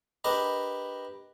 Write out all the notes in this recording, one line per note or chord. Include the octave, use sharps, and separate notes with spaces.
D4 G4 A#4 B4 D#5